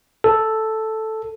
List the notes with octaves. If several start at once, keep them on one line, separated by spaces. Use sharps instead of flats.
A4